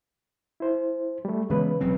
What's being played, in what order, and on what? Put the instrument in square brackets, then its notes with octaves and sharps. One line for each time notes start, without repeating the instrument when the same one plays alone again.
[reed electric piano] E4 C5
G3 A3
[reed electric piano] C#3 B4 [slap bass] E3 G#3 B3
[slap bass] E1 F#3 C4